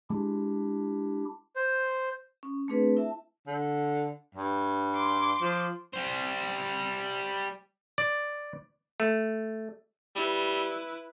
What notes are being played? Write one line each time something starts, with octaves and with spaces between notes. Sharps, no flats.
G#3 D4 E4 G4
C5
C#4
A3 C4 D4 G#4 B4
E4 E5 A5
D3
G2
C6 D6
F3
G3 C5
D5
A3
G3 E4 B4